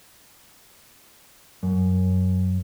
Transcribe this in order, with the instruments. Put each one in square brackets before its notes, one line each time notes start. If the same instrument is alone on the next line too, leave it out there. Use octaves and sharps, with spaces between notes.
[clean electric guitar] F#2